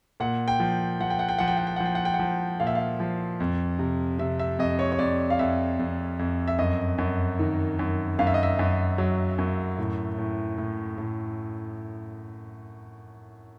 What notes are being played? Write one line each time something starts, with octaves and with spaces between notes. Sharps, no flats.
A#2 F#5
G5
F3
F3 F#5
G5
F#5
G5
F3 F#5
G5
F#5
G5
F3 F#5
G5
F#5
G5
F#5
F3
A#2 F5
E5
F5
F3
F2
C3
C3 E5
E5
F2 D#5
C#5
C#5
F2 D5
F5
F2 E5
F2
F2
E5
F#2 D#5
F#2
D#3
F#2
F#2 F5
E5
D#5
E5
F#2
F#3
F#2
A2
A2
A2
A2